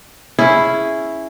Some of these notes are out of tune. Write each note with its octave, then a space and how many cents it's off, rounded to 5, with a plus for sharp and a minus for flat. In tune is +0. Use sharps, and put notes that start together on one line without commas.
C#4 +0 E4 +0 G#4 +0